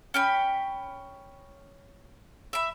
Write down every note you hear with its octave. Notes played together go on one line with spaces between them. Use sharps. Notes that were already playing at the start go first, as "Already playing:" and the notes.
C#4 G5 B5
E5 B5